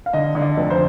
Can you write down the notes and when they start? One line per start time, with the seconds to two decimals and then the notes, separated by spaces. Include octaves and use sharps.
0.06 F5
0.13 D3 D#5
0.35 D3
0.42 D5
0.57 F1
0.70 C5